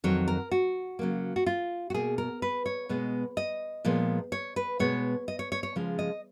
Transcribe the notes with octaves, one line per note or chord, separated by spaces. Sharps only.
F2 D#3 F#3 C#5
A#4
F#4
C#3 F#3 A#3
F#4
F4
F#4
B2 A#3 G#4
A#4
B4
C#5
B2 G#3 B3
D#5
A#2 F3 G#3 B3
C#5
B4
B2 G#3 B3 C#5
D#5
C#5
C#5
C#5
C#3 F3 G#3
D#5